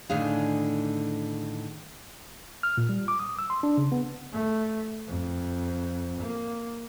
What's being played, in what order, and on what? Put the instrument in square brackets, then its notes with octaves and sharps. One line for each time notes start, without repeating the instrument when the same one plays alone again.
[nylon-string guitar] A2 D3 D#3 D4 G#4 F5
[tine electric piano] F6
A#2
G3
D6
D#6
E6
C6
D4
C#3
B3
[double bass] A3
F2
A#3